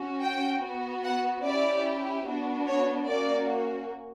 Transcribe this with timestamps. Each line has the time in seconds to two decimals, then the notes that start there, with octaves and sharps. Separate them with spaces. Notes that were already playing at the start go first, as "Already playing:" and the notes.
Already playing: C#4 F#4
0.22 G5
0.63 B3 F#4
1.04 F#5
1.44 C#4 E4 G4 D5
2.26 B3 D4 F#4
2.67 C#5
3.08 A#3 C#4 F#4 D5